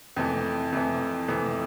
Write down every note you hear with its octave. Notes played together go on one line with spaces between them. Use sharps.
F2 C3 E3 A3
F2 C3 E3 A3
F2 C3 E3 A3